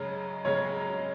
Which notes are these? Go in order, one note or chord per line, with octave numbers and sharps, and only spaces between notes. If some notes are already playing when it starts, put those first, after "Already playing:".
Already playing: F#2 C#3 G#3 C#5
F#2 C#3 G#3 C#5